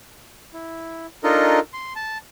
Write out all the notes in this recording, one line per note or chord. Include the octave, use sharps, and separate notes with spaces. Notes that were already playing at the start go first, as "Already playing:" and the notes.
E4
D4 D#4 F4 A4 A#4 D#5
C6
A5